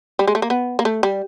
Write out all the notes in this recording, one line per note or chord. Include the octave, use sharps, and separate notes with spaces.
G3
G#3
A3
A#3
B3
A#3
A3
G3